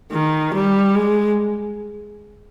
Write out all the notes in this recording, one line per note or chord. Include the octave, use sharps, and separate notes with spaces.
D#3
G3
G#3